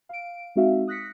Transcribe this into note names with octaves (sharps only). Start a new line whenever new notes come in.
F5 D7
G#3 C4 D#4 F#4 E5 F5
D#6 F#6 A#6 B6 C#7